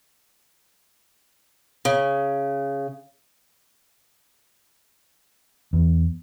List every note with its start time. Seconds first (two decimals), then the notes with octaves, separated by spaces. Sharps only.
1.85 C#3
5.73 E2